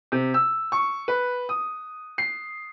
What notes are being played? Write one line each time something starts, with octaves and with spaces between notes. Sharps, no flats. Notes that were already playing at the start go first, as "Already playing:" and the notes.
C3
E6
C#6
B4
D#6
C7